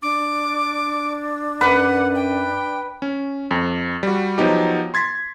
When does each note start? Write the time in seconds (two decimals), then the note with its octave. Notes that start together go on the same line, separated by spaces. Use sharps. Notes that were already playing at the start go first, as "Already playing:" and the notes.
0.02 D4 D6
1.61 F#2 B4 F#5
2.15 G5
3.02 C#4
3.51 F2
4.03 G3 F#4
4.38 F3 F#3 B3 D#4 G4
4.94 C6 G#6 A6 B6